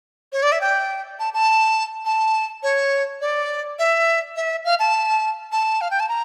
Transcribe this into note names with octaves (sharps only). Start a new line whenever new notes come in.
C#5
D5
E5
G5
A5
A5
A5
C#5
D5
E5
E5
F5
A5
A5
F5
G5
A5
A#5